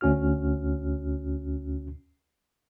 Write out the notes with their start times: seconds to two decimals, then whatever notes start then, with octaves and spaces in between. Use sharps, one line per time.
0.01 D2 C#4 F#4 F6